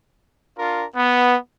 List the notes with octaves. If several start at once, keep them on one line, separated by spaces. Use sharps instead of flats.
D4 F4 A#4
B3